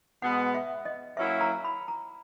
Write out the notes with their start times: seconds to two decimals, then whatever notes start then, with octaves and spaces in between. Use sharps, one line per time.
0.22 B2 G#3 B3 F#5
0.54 E5
0.85 D#5
1.17 F#3 A#3 C#4 E4 E5
1.41 A#5
1.64 B5
1.88 A#5